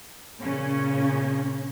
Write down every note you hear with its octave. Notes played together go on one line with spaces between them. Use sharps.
A#2 C#3 C#4